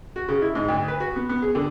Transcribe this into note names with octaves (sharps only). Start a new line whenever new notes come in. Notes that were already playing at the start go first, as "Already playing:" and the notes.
F#4
C#3
E4
G#2
D2
B4
F#4
B3
B3
G#4
D3